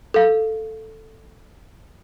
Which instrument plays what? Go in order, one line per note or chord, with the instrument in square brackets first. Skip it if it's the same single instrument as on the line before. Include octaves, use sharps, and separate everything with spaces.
[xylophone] A4 F5